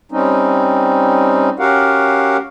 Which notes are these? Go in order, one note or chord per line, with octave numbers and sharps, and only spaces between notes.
G3 C4 C#4 D#4
C#4 F#4 G4 A#4 F5 F#5